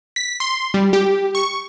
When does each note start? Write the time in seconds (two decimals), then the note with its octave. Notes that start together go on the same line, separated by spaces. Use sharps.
0.16 B6
0.40 C6
0.74 G3
0.93 G4
1.35 C#6